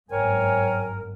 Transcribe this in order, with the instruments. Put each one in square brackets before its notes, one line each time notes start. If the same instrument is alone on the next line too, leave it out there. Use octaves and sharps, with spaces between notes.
[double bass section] G1 G#2 F#3 [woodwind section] C4 C#5 G#5 [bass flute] A#4